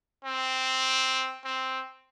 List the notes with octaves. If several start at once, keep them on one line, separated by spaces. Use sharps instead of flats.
C4
C4